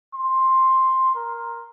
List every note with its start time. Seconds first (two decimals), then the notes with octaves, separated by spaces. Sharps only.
0.14 C6
1.15 A#4